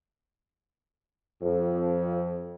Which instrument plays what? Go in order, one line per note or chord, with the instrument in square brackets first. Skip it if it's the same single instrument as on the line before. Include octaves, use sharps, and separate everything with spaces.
[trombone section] F2